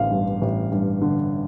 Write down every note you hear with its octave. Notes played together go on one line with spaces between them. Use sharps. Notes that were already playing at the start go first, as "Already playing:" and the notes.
Already playing: A1 D3 F5
G2
A1
G2
D3